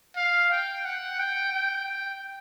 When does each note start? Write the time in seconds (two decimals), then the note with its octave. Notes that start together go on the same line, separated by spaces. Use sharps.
0.16 F5
0.51 G5
0.85 F#5
1.19 G5
1.53 G5